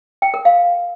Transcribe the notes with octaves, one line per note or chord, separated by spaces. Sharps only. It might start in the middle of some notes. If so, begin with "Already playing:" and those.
G5
A#4
F5